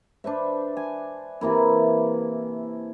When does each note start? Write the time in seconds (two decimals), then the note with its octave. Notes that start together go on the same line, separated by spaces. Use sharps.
0.24 D4 B4 C5 E5
0.77 G#5
1.41 C3 E3 A#3 E4